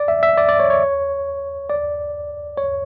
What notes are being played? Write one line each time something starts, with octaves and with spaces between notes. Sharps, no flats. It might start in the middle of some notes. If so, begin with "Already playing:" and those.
Already playing: D5
E5
E5
D5
D5
C#5
C#5
D5
C#5